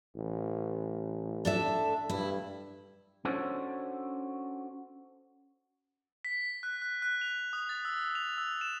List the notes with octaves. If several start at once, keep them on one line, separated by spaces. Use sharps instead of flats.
A1
D4 A4 E5
G2 E4
C#4 D4 F#4 A4 C5 C#5
B6
F#6
F#6
F#6
F7
D#6
A6
E6
F7
E6
E7